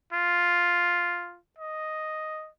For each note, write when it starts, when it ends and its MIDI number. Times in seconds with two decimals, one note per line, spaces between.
0.13 1.38 65
1.59 2.49 75